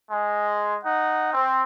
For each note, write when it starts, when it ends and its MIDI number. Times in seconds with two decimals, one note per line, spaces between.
0.11 0.76 56
0.83 1.30 63
0.83 1.30 78
1.33 1.62 60